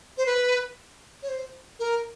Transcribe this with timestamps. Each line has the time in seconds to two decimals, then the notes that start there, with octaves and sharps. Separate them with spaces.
0.18 C5
0.26 B4
1.23 C#5
1.29 C5
1.79 A#4